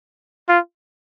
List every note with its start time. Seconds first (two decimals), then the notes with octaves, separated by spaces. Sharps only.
0.49 F4